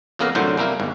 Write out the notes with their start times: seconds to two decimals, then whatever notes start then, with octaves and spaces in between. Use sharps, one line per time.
0.19 F2 C#3 A#3 B3 F5 A#5
0.35 C2 F#2 A2 D3 F#3 C5
0.57 C2 G3 A#3 E4 A#4
0.80 G1 G#2